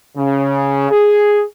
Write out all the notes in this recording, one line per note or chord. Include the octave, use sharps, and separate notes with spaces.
C#3
G#4